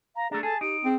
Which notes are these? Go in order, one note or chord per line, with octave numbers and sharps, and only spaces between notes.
F5 A#5
A3 D4 G#4 A#5
G#4 A4 A5
D#4 G4 D7
C4 G#4